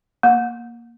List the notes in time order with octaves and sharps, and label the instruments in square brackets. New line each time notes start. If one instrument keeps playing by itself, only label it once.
[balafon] A#3